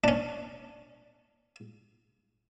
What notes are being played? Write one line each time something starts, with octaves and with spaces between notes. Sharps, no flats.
C#4 D4